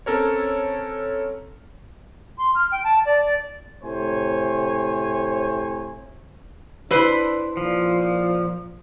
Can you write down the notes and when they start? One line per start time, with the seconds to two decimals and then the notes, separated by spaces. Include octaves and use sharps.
0.06 C4 C#4 A4 A#4 C#5
2.38 C6
2.55 F6
2.71 G5
2.84 A5
3.05 D5
3.83 A2 C3 C5 C#5 G#5
6.91 D4 E4 B4 C5
7.57 A#2 F3